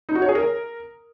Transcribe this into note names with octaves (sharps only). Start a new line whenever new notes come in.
D#4
F#4
C#5
G#4
A#4